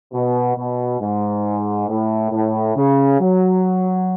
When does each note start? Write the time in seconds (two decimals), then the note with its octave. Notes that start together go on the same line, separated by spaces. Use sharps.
0.13 B2
0.57 B2
1.01 G#2
1.88 A2
2.32 A2
2.76 C#3
3.20 F#3